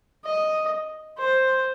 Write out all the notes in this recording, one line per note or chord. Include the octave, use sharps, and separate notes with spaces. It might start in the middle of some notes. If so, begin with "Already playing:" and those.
D#5
C5